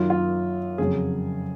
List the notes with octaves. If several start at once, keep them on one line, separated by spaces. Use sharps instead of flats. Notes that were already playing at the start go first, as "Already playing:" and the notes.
Already playing: F#2 D#3 F#3 F4
F4
F2 C#3 F#3 G#4